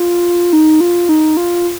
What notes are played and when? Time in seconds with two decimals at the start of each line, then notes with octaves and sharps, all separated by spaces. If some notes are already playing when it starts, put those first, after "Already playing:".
Already playing: F4
0.53 D#4
0.81 F4
1.09 D#4
1.37 F4